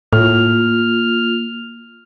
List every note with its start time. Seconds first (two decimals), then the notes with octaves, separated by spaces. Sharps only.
0.13 A2 A#3 F4 F6